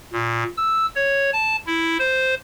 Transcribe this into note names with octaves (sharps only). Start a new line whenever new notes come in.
A#2
E6
C#5
A5
E4
C5